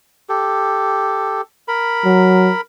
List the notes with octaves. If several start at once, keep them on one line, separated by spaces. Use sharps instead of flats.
G4 A4
A#4 B5
F#3